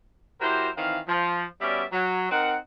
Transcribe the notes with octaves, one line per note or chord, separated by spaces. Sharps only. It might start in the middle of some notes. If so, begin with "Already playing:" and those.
F#3 E4 G4 A#4 C5
D#3 E3 C4 F5
F3
G3 B3 C#4 F#4 D5 E5
F#3
C4 D#4 A#4 F#5